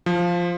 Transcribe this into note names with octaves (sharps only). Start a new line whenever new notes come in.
F3